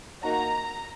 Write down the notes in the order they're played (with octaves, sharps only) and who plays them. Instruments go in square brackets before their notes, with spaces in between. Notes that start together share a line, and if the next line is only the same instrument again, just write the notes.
[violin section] A#3 D#4 F#4 A#5